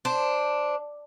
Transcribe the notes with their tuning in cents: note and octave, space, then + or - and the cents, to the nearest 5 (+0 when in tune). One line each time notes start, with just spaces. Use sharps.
D4 +0 C5 +0